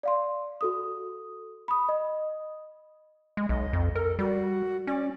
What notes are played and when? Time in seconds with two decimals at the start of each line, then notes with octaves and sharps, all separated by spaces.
0.03 D5 F5 C6
0.61 F#4 A4 D#6
1.68 B5 D#6
1.89 D#5
3.37 G#3
3.49 B1 D#5
3.73 F2
3.95 A4 A#4
4.19 G3 F#4
4.87 C#4 D5